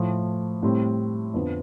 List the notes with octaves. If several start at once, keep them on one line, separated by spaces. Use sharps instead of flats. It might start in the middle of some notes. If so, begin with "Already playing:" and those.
Already playing: A2 F3 A3
A2 G3 C4
F2 D3 F3 B3